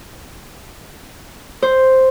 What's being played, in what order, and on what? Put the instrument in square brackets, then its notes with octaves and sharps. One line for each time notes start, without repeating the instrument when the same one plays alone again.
[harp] C5